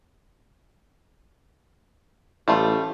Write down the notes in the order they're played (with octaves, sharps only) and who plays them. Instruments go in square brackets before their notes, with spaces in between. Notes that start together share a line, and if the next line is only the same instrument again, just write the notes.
[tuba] A1 [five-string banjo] G3 A3 F4